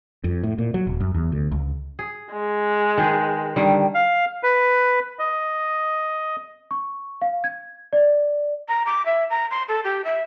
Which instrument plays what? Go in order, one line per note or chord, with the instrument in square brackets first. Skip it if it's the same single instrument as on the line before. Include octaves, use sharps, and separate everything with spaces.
[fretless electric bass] F2
A2
A#2
F#3
D#1
F#2
E2
D2
C#2
[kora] G#4
[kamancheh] G#3
[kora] D#3 G#4 B4
D3 D#3 G3
[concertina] F5
B4
D#5
[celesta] C#6
F5
G#6
D5
[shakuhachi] A#5
D6
E5
A#5
C6
A4
G4
E5